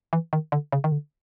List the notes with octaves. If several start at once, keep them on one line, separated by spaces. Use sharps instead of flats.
E3
D#3
D3
C#3
D#3
D3